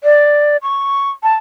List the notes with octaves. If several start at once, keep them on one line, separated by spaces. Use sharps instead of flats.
D5
C#6
A5